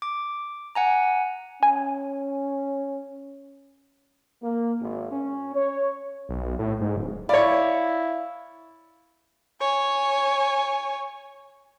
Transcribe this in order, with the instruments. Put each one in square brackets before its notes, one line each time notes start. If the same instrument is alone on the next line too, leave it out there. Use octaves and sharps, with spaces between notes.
[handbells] D6
F#5 G#5 A#5
[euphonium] C#4 [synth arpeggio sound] G#5
[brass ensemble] A#3
G#1
C#4
C#5
[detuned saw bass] B1
A2
G#2
D1
[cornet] E4 [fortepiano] C#5 D5 [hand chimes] F5 B5
[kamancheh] C#5 G#5